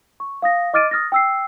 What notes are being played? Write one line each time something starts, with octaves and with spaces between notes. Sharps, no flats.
C#6
F5 D#6 A#6
D#5 D6 F6 A6 D7 D#7
D#6 F6 A6 A#6
G5 E6 C7